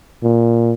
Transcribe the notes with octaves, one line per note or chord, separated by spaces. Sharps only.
A#2